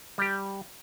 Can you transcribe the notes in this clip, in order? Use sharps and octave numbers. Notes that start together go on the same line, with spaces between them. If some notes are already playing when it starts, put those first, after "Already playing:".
G3 G4